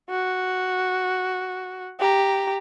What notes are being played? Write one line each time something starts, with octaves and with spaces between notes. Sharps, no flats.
F#4
G4 A#5